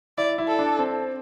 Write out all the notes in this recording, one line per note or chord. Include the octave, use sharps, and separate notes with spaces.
E4 D5
E4
A4
D4
C4